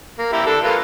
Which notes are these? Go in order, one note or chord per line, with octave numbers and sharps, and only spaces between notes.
A#3
E4 G4 A#5
D4 A4
A#3 F4 B4